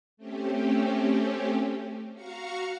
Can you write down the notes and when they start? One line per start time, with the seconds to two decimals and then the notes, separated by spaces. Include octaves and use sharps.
0.17 A3 C4 C#4 G4
2.14 F#4 F5 A#5 C#6 C#7